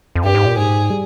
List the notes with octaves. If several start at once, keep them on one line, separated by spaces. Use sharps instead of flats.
F2
G2 G4
G#2
A#2
G#2 G#4
G3